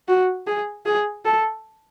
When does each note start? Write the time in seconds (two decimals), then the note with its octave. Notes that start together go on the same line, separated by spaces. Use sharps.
0.08 F#4
0.47 G#4
0.86 G#4
1.25 A4